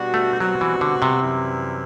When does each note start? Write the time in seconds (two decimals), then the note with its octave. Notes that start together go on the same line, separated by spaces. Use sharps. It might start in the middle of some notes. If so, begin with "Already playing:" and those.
Already playing: B2 G3 D4 F#4
0.14 A3
0.40 B2 F#3 G3 C4 F#4
0.61 E3
0.81 D3
1.02 C3
1.22 F#2 E3 G3 C4 E4